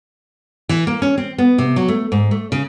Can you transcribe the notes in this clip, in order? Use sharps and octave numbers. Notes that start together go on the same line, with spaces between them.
E3
A#3
C#4
C4
B3
C3
F#3
A3
G#2
A3
C#3